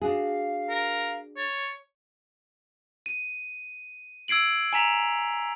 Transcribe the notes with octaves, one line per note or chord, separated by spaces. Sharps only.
D4 F#4 G#4 F5
A#4
C#5 A6
D#7
E6 G#6 C7 D7 F#7
G#5 A#5 B6 F7